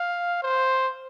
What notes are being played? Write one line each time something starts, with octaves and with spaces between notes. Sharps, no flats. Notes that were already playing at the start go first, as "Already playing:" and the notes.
Already playing: F5
C5